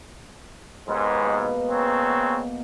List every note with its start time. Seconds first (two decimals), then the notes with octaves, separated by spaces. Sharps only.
0.88 D#2 G#2 G#3 B3
1.20 B2 A#3 B3
1.70 C#3 F#3 C4